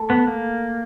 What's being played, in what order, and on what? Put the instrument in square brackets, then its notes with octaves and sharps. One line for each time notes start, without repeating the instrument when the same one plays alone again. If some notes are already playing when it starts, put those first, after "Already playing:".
Already playing: [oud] A3
[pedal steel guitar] B3
A#3